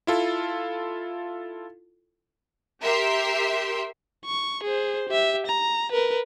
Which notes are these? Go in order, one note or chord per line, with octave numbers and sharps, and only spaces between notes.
E4 F4 A4
G4 A#4 E5 C6
C#6
G#4 C5
G4 E5
A#5
A#4 B4